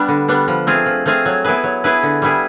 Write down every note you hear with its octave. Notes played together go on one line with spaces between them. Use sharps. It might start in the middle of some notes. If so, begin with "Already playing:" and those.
Already playing: G3 B3 D4
D3
G3 B3 D4
F3
A3 C4 F4 G#4
F3
A3 C4 F4 G#4
F#3
B3 E4 G#4 B4
F#3
B3 E4 G#4 B4
D3
G3 B3 E4 G#4